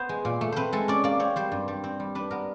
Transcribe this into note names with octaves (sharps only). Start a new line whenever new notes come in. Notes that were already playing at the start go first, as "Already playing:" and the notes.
Already playing: B3 C5
G#3
A#2
A3
C4 B4 C5
G#3 A4
C#4 D5
A#3 D5
C4 C#5
G3 C5
G2
G3
C4
G3
D4 B4
B3 A#4